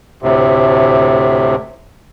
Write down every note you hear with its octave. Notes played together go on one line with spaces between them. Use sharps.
D2 A2 C3